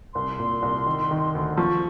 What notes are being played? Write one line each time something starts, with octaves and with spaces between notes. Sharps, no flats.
C2 C6
A#2
C2
D#3
D#3
D2
F3 C#6